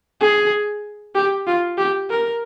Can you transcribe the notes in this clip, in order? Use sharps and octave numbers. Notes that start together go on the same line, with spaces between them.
G#4
G4
F4
G4
A#4